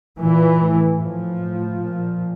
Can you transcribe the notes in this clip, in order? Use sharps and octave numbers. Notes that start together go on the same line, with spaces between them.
A#2 E3
A2
A2 F3
A2
A#2